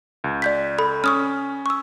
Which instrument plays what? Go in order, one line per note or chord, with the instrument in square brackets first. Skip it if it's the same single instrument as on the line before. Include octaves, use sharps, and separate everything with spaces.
[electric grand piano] C#2
[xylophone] D5 G6 B6
A4 B5
[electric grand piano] C#4 [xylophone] C#6 D#6 F6
[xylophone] C#6 E6